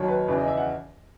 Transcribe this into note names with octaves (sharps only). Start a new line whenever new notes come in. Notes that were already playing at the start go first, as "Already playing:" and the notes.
Already playing: D#2 D#3 F#3 C#5
B4
E2 C#3 E3 B4
D#5
E5
F#5